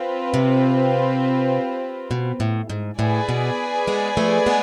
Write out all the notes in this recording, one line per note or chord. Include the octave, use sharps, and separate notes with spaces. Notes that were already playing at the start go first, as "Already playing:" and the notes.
Already playing: C4 F4 B4
C3
B2
A2
G#2
A2 G#4 B4 D5 G#5
B2
G#3 B3
F3 A3
G#3 B3